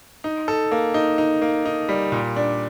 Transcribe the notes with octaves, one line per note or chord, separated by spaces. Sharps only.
D#4
A4
A#3
D#4
D#4
A#3
D#4
G3
A#2
D4